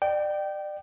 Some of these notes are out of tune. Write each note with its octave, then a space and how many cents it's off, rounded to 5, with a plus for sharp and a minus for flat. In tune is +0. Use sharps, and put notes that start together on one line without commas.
D5 +35 G5 -20